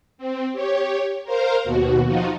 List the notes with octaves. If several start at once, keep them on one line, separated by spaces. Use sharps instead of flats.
C4
G4 C#5
A#4 C5 F5 A#5
D#2 B2 F#4
F3 D#4 F4 F#4